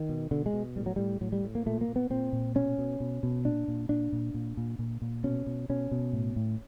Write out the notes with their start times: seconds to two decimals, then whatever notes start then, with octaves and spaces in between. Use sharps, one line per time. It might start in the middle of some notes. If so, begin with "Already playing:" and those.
Already playing: D#3
0.09 B2
0.31 B2 D3
0.46 G#3
0.53 B2
0.76 A2 G3
0.86 F#3
0.96 A2 G3
1.21 A2 F#3
1.32 G3
1.44 A2
1.55 A#3
1.66 A#2 A3
1.81 A#3
1.88 A#2
1.96 B3
2.10 A#2 C4
2.33 A#2
2.55 B2 C#4
2.78 B2
3.00 B2
3.23 B2
3.45 A#2 D4
3.68 A#2
3.89 A#2 D4
4.12 A#2
4.34 A#2
4.57 A#2
4.79 A#2
5.02 A#2
5.24 B2 C#4
5.47 B2
5.69 B2 C#4
5.91 B2
6.13 A2
6.36 A2